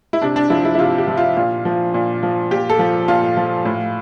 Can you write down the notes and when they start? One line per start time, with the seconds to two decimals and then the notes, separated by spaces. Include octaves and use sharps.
0.13 E4
0.22 C3 D4
0.36 D4
0.50 F3 E4
0.65 E4
0.75 E4
0.79 C3 F4
0.98 G4
1.08 F3
1.17 F4
1.36 A#2 F4
1.65 F3
1.94 A#2
2.23 F3
2.51 A#2 G4
2.70 A4
2.79 F3
3.08 A#2 F4
3.37 F3
3.65 A2